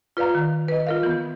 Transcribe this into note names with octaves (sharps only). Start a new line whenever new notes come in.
F4 B4 D5 F5 A#5
D#3
B4 D#5
F4 A#4 F5
E3 B3